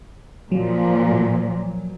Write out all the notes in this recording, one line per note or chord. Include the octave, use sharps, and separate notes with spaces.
A#2 F3 F#3